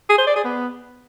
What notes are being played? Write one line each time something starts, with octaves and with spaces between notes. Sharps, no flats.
G#4
C5
D5
G#4
B3